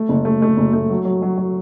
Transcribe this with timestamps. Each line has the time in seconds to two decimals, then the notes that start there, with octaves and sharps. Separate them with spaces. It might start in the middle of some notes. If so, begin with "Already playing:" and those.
Already playing: A3
0.09 F#1
0.25 A3
0.42 A3
0.57 F#1
0.73 A3
0.90 F#3
1.05 F#3
1.22 F#3
1.38 F#3